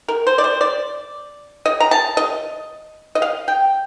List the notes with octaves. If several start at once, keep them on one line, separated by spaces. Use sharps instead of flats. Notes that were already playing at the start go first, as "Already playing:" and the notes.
A#4
C5
D5
C5
D5
D#5
A#5
A5
D#5
D#5
F5
G5